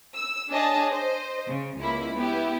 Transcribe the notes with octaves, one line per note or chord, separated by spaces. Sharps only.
E6
D4 G#4 C#5 D#5 A5
C5 D#5
C#3
C#2 A#3 E4 B5
B3 E4 G4